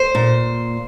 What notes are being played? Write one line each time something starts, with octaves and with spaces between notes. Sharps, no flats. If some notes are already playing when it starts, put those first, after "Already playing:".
Already playing: C5
A#2